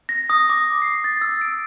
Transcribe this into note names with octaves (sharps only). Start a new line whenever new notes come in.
A#6
D#6
D6
C7
A6
E6
D7